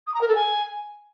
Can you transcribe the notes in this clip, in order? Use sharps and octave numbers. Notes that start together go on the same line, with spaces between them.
D#6
A#5
A#4
A4
G#5